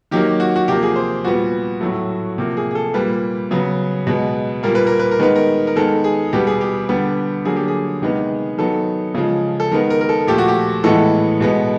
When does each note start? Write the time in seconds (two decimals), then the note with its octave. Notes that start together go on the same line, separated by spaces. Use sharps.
0.11 D#3 F#3 A#3 G4
0.40 F#4
0.56 F#4
0.68 C3 F3 A#3 G4
0.83 G#4
0.96 C5
1.24 A#2 G3 B3 F#4
1.81 A2 F#3 A3
2.38 C3 F3 A#3
2.57 G#4
2.71 G#4
2.75 A4
2.94 A#2 G3 A#3 B4
3.51 C#3 F#3 B3
4.07 B2 G#3 B3
4.63 A#2 G3 A#3 A#4
4.75 B4
4.87 A#4
4.99 B4
5.11 A#4
5.19 D#3 G#3 B3 B4
5.36 A#4
5.67 A#4
5.76 D#3 G#3 B3 A4
6.04 G#4
6.33 B2 G3 B3 G4
6.47 G#4
6.61 G4
6.89 D3 G3 B3
7.45 D3 F#3 A#3 G#4
7.56 G4
7.68 G#4
8.02 C3 D#3 G#3 B3
8.58 D#3 F#3 B3 A4
9.15 C#3 F3 G#3
9.60 A4
9.72 D#3 G#3 B3 A#4
9.90 A#4
10.01 A#4
10.09 A4
10.27 A#2 F3 A3 G4
10.38 F#4
10.48 G4
10.84 A2 E3 G#3 B3 A4
11.41 B2 G#3 B3